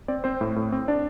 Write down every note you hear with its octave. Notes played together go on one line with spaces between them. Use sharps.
C4 D5
C4 C5
A2
A2
C4
D4 D5